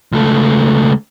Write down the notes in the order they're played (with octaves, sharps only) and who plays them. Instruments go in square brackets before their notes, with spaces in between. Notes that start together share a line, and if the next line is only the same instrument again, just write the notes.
[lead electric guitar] C#2 A3